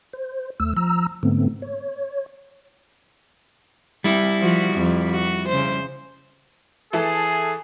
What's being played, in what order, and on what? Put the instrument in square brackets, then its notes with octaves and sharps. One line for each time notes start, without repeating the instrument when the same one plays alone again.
[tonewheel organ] C5
D#2 A3 E6
F3 A#5 E6
G#2 D3 A3 B3 C4
C#5
[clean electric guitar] G3 E4
[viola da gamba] F3 F#4
F2
F#4
C#3 C5
[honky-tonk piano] E3 E4 A4 [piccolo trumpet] G#4